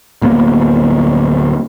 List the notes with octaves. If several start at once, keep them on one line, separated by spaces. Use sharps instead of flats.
D1 A#3 B3